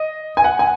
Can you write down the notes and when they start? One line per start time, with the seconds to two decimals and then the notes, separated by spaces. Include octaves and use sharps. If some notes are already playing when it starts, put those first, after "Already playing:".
Already playing: D#5
0.37 G#5
0.44 F#5
0.59 G#5